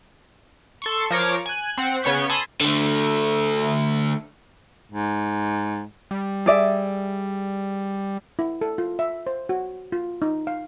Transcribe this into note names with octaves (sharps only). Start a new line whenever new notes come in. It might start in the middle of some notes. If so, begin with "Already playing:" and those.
A4 C6 C#6
F3 A#4 C#5 D6
G#5 F#6
C4 F#5 C7
C#3 B3 C#5 C#6 G6 B6
G#5 A5 B5 C6 D#6 E6
D3 A3
G#2
G3
G#4 D5 E5
E4
A4
F4
E5
C5
F#4
F4
D#4
F5